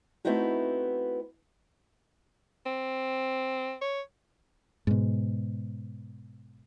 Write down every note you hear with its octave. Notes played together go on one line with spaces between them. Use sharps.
A3 B3 C4 D#4 E4 F#4
C4
C#5
G#2 B2